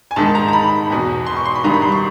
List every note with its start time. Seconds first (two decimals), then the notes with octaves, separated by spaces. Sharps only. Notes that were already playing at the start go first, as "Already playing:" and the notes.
0.11 G#5
0.16 G#2 D#3 A5
0.35 A#5
0.48 A#5
0.53 B5
0.90 E2 B2
1.27 C6
1.36 C#6
1.45 C6
1.55 B5
1.64 G2 D#3 A#5
1.73 B5
1.82 C6
1.92 C#6